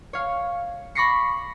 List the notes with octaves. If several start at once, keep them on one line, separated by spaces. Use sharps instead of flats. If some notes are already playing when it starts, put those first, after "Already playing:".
C#5 F5
B5 C#6 D6 A#6 C7 C#7